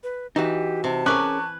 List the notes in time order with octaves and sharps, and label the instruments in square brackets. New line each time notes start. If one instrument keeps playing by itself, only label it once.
[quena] B4
[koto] E3 [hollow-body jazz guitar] D#4 F#4 [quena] G4
[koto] C3 [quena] A5
[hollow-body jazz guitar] C#4 G#4 A#4 [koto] B4 G#5 [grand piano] C#6 D6 F#6